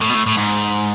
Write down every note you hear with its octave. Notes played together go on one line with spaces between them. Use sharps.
A2
B2
A2
A2
G#2